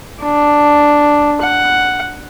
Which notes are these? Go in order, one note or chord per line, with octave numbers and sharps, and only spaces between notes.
D4
F#5